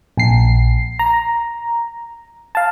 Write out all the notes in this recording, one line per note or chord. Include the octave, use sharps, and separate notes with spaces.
A#1 C7
A#5
F5 A5